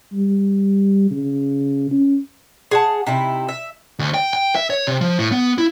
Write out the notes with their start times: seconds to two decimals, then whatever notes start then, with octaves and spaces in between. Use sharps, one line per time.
0.13 G3
1.11 C#3
1.91 C#4
2.71 G#4 F#5 A5
3.07 C3 D#4 E4
3.49 E5
3.99 D2
4.14 G5
4.33 G5
4.55 E5
4.70 C#5
4.87 C3
5.01 F3
5.19 A2
5.32 B3
5.58 E4